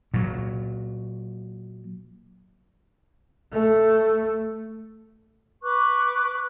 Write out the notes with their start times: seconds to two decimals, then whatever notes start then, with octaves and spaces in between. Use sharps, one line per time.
0.14 A#2 F#3
3.52 A3
5.64 B4 C#6 D6 F#6